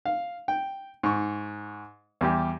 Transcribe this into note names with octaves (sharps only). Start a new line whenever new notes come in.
F5
G5
G#2 C#6
E2 G3 G4